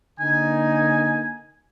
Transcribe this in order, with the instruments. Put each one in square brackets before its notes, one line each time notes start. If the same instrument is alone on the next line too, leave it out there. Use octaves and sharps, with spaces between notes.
[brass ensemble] D3 A#3 D#4 [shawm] G#5